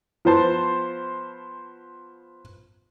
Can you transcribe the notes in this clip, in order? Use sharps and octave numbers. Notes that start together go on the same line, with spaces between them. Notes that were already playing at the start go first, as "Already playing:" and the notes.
F3 B3 C5 A5